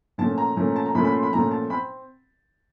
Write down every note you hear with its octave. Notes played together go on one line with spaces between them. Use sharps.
A#2 F3 A3 C#4 A5
A#5
A#2 F3 A3 C#4
A5
A#5
A#2 F3 A3 C#4 B5
B5
C6
B5
A#2 F3 A3 C#4 A#5
A5
C4 B5